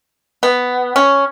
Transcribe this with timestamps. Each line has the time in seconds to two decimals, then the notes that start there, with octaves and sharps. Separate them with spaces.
0.43 B3
0.96 C#4